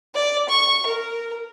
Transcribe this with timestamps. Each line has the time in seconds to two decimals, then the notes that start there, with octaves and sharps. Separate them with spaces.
0.15 D5
0.49 C#6
0.86 A#4